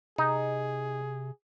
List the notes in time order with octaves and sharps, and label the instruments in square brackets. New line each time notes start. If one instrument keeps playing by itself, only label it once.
[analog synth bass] C3 [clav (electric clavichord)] D#4 [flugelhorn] G#4